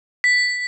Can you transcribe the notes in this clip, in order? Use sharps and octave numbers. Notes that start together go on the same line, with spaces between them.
B6